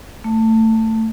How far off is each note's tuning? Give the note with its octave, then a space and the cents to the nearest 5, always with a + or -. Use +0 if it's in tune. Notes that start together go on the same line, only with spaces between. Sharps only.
A3 +20